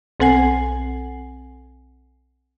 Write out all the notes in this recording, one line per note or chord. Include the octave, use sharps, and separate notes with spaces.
B1 C4 A4 F#5 G#5 C7